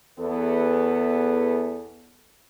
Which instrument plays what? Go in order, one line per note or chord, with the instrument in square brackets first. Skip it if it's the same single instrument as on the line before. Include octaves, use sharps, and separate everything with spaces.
[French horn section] E2 B3 A4